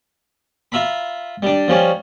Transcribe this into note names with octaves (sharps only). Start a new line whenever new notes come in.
F4 E5 A#5 B5
G3 D4
F3 G3 C#4